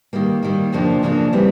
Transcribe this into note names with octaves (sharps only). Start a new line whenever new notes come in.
D#3 G3 A#3
D#3 G3 A#3
F2 C#3 F3 A#3 D4
F2 C#3 F3 A#3 D4
E3 G3 C4 E4